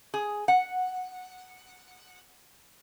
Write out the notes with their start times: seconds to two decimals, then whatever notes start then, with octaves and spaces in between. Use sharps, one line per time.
0.14 G#4
0.48 F#5